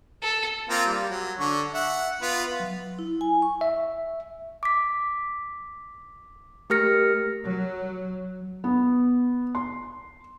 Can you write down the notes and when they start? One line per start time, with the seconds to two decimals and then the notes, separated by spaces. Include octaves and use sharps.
0.22 A4
0.69 A#3 C4 F4
0.86 G3
1.09 F#3
1.39 D3 C#6
1.74 E5 F#5
2.21 B3 F4 B4
2.60 F#3
2.99 E4
3.21 G#5
3.42 C#6
3.61 E5
4.63 D6 B6
6.70 A3 G4 A#4 F6 A#6 C#7
7.44 F#3
8.64 B3
9.55 C6